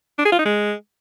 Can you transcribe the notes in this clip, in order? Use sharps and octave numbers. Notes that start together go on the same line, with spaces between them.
D4
G#4
F4
D#4
G#3